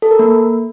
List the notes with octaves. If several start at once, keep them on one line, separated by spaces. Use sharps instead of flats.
A4
A#4
A#3